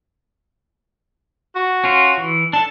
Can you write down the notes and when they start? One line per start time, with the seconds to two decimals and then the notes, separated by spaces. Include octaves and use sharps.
1.55 F#4
1.84 C#4 F4
2.17 E3
2.53 D4 A4 A5